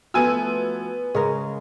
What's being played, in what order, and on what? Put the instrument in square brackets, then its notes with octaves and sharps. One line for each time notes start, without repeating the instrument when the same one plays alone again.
[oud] F3 A3 [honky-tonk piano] B3 G#5 E6 [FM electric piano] F#4
[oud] C#3 G#3 A#4 [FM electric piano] G#4 D#5